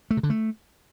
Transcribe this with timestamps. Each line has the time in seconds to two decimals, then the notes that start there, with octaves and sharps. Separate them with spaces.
0.11 A3
0.17 C3
0.23 D3
0.30 A3